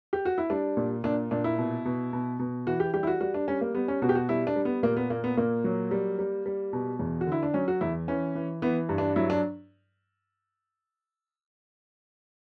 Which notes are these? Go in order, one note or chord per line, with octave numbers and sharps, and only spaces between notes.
G4
F#4
E4
G3 D4
A#2
A#2 D4
A#2 D4
E4
B2
B2
B2
B2
E3 F#4
G4
G3 G4
E4
F#4
G3 F#4
D4
G3 C#4
A#3
G3 B3
C#4
B2 F#4
G4
F#4
G3 E4
D4
G3
B3
A#2 A#3
B3
A#2 A#3
B3
A#2 A#3
F#3
G3
G3
G3
B2
E2
F#4
D3
E4
D4
F#3 C#4
F#4
E2 E4
E3 C#4
E3
E3 B3
G2
D4
F#3 E4
D4